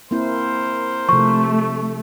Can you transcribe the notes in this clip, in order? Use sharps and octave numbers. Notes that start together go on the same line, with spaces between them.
A#3 C4 E4 A#4 C5
C3 F3 A3 C#6